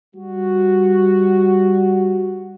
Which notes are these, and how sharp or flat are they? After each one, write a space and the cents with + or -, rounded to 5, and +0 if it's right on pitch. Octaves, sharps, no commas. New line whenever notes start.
G3 +0 F#4 +0